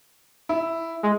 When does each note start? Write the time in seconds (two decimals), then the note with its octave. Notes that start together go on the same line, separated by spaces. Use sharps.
0.49 E4
1.03 G#3